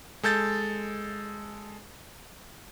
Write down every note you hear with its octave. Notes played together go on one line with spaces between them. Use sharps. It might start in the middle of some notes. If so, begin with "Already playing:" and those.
G#3 A4 G6 A6